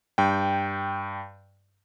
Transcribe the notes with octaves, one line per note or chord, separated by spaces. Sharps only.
G2 G5